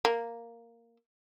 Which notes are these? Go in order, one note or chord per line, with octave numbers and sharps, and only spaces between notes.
A#3